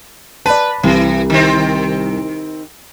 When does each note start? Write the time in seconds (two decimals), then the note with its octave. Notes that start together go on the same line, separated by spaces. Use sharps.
0.46 B4 D5 A5
0.83 C2 E3
1.30 D#3 C4